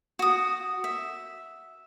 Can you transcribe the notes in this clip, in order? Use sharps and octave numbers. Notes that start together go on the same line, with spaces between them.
F#4 D#6
E5